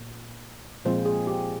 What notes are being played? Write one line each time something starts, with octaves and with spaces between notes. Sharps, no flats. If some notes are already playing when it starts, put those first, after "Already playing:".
Already playing: A#2
A#2 F3 G#3 C4 F4 C5
G#4
G4